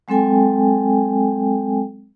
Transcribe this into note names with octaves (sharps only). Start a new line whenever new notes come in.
F#3 G#3 C4 A4 G5 G#5